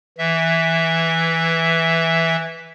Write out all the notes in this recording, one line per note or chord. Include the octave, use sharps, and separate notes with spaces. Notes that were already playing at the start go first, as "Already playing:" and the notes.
E3 E5